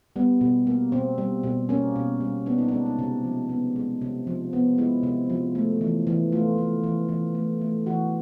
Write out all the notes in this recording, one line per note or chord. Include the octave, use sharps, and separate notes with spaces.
G3 B3
B2
A#3
B2 C4
G3
B2
A#3 C#4
B2
G3
B3 D4
D#4
G#3 D4
D#4
C3
F3
B3
G#3
C3
F3
B3
G#3 E4
C3
F3
A3
E3
E3
A3 F4
A3
E3
E3
A3
A3
E3 F#4